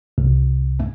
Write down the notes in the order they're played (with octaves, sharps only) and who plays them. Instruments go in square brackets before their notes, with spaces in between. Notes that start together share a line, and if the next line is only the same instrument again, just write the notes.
[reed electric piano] C2